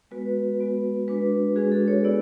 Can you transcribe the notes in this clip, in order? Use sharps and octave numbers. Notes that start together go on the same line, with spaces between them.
G#3 B3 F#4 B4
G#3 B3 F#4
G#3 D4 F#4 B4
G#3 D4 F#4 G#4
A4
C#5
B3 E4 D5